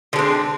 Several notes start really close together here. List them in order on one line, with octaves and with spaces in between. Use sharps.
D3 G#3 C4